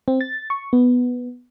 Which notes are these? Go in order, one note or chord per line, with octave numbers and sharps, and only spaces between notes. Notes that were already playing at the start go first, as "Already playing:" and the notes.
C4
A6
C#6
B3